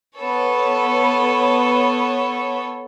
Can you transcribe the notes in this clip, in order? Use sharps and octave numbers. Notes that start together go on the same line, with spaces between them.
B3 A4 C#5